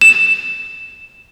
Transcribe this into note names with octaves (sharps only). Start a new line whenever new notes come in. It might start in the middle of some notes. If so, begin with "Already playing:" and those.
E7